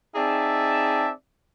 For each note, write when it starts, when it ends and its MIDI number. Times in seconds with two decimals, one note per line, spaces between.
0.15 1.10 60
0.15 1.10 63
0.15 1.10 68
0.15 1.10 74
0.15 1.10 76
0.15 1.10 81